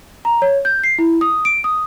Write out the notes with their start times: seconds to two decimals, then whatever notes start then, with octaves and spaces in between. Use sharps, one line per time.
0.25 A#5
0.42 C#5
0.65 G6
0.84 C7
0.99 E4
1.21 D#6
1.45 D7
1.64 D#6